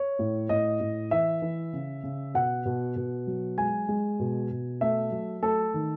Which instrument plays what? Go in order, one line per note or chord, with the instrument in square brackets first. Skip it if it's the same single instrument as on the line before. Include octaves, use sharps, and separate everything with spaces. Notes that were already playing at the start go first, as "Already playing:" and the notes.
Already playing: [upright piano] C#5
A2
A2 D#5
A2
E3 E5
E3
C#3
C#3
B2 F#5
B2
B2
F#3
G#3 G#5
G#3
B2
B2
A3 E5
F#3
A3 A4
D#3